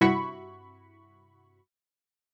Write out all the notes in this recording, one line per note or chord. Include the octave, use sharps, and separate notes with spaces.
G2 C3 E4 F#4 B5 C#6